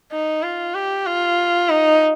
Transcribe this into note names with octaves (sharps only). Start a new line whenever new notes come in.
D#4
F4
G4
F4
D#4